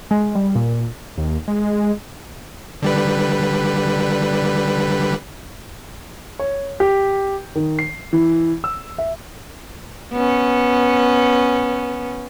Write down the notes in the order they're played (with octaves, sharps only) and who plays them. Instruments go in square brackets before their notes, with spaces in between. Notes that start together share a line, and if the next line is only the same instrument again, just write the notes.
[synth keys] G#3
G3
A#2
[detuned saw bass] D#2
G#3
[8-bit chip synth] D3 G3 B4
[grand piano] C#5
G4
D#3
C7
E3
E6
E5
[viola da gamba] B3 C#4